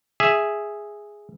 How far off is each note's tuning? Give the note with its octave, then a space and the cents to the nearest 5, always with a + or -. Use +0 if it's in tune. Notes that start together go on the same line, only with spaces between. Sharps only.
G#4 +0 E5 +0